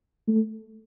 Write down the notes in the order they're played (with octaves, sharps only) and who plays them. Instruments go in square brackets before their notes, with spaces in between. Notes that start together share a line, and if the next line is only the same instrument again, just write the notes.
[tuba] A3